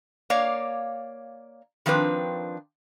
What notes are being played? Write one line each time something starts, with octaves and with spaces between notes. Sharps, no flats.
A#3 C#5 D5 F5
D#3 F3 C4 D4 B4